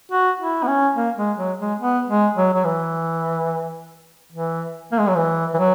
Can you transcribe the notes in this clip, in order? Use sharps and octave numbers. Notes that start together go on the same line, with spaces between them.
F#4
E4
B3
C#4
A#3
G#3
F#3
G#3
B3
G#3
F#3
F#3
E3
E3
A#3
G#3
F#3
E3
E3
F#3